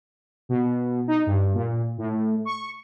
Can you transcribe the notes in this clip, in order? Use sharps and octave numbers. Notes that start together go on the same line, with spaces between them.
B2
D#4
G2
A#2
A2
C#6